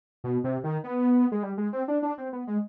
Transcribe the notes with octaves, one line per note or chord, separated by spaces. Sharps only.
B2
C3
D#3
B3
G#3
G3
G#3
C4
D4
D4
C4
B3
G#3